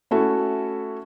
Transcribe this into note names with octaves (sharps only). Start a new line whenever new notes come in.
A3 C#4 E4 F#4 A4